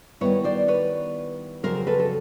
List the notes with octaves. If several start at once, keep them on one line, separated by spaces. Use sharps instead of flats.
D#3 G3 B3 E4 B4 C#5
C5 D5
B4 C#5
F2 C#3 F#3 A#4 C5
A4 B4
A4